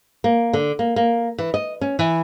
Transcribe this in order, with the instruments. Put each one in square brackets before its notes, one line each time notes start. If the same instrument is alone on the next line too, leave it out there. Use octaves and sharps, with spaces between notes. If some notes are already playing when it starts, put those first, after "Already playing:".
[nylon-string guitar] A#3
D3
A#3
A#3
E3
D#5
C#4
E3